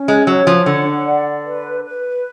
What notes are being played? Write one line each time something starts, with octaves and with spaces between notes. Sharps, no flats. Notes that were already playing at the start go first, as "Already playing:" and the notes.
Already playing: C#4
G#3
F#3 C#5
F3
D3 F#5
D5
B4
B4